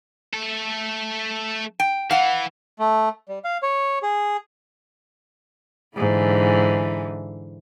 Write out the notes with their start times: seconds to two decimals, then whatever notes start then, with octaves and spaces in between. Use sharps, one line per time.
0.34 A3 A4
1.80 G5
2.11 E3 F5 F#5
2.79 A3
3.29 G3
3.44 F5
3.63 C#5
4.03 G#4
5.97 G#2 D3 E3